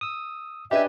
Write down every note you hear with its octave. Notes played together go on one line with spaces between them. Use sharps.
D#6 E6
D4 G4 B4 D#5 E5 G#5